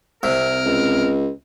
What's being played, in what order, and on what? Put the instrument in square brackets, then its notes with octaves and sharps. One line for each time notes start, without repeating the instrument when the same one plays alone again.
[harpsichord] C2 C3 [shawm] A#4
[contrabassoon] C#2